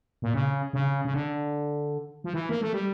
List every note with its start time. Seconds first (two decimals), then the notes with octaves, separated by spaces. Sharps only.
0.22 A#2
0.34 C#3
0.73 C#3
1.05 C#3
1.14 D3
2.24 F3
2.33 E3
2.49 A#3
2.61 A3
2.73 G3